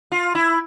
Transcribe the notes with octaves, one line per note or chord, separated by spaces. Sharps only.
F4
E4